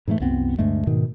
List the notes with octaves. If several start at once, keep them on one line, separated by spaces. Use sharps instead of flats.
G#2 E3 G#3 A3
C2 F#2 B3 C4
D2 G2 G#3 A3
G#2 B2 D#3